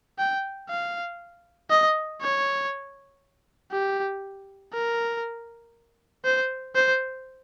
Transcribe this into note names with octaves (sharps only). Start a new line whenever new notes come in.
G5
F5
D#5
C#5
G4
A#4
C5
C5